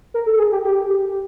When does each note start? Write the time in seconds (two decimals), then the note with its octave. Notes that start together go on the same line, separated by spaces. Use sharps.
0.14 A#4
0.26 A4
0.38 G#4
0.52 G4
0.64 G4